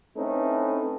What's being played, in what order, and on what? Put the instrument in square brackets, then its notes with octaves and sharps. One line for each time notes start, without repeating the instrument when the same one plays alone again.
[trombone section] A3 C4 C#4 D#4 E4 B4